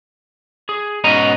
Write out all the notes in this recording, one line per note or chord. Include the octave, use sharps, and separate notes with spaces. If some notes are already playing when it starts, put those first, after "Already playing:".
G#4
G#2 B2 B3 C#4 D#5 A#5